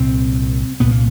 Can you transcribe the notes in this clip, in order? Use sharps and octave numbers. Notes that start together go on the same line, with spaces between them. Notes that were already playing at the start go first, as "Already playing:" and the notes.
Already playing: C2 A#2 C4
C2 A#2 B3
A#3